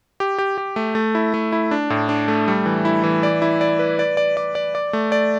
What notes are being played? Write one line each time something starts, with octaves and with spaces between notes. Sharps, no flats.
G4
G4
G4
A3
A3
E4
A3
E4
D4
A2
D4
A3
G3
E3
E4
E3
D5
E4
D5
B4
D5
D5
D5
D5
D5
A3
D5